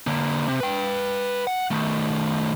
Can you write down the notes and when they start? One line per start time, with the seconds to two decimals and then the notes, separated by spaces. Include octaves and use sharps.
0.07 D3 A#3
0.48 C3
0.60 B4 G5
1.47 F#5
1.71 D#3 A3